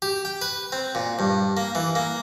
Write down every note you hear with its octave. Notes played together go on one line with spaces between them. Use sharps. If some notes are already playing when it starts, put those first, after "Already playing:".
G4
G5
B4
C4
A#2
G2
A#3
E3
A#3